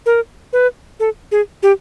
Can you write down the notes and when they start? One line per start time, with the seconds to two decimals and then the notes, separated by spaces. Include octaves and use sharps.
0.06 A#4
0.53 B4
1.00 A4
1.32 G#4
1.63 G4